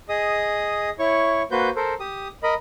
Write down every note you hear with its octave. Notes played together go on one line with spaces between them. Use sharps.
G#4 D#5 D#6
E4 C#5 C#6
A#3 F#4 B4 C5 G6
A4 A#4 C5
G4 D#6
A#4 D#5 B5